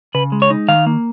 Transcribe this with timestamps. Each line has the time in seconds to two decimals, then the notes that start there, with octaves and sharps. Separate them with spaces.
0.15 C#3 B4
0.32 G#3
0.42 C#5
0.50 D#4
0.68 D#3 F5
0.86 A#3